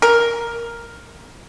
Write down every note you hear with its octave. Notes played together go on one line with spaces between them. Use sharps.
A#4